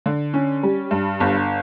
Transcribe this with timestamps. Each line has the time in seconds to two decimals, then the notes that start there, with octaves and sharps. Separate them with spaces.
0.06 D3
0.34 C#4
0.63 G3
0.91 G2
1.20 G1